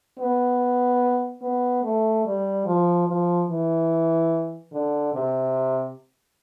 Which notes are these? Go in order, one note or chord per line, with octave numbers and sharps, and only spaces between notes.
B3
B3
A3
G3
F3
F3
E3
D3
C3